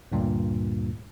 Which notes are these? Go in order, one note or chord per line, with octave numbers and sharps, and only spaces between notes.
D2 G2 A#2